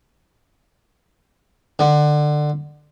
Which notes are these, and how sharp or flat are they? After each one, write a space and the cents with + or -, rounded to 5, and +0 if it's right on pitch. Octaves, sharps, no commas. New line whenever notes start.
D3 +20